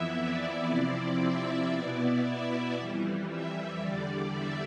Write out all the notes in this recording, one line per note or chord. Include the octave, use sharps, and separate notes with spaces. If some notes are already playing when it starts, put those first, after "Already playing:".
Already playing: F2 E3 B3 E4 E5
D5
C3 F3 C4 E4 D5
E5
B2 B3 E4 D5
E5
F2 E3 G3
E5
E2 D3 G3 D5
E5